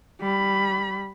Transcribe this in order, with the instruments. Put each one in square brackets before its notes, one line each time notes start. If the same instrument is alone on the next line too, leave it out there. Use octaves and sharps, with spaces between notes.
[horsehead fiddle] G3 B5